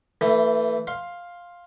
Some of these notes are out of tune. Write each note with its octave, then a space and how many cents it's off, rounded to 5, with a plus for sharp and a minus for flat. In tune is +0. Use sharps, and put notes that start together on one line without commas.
E3 +0 A3 +30
F5 +5 C6 +10